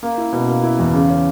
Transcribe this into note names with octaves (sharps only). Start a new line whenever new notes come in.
A#3
E4
B2
A#3
E4
E2
C#3
C#4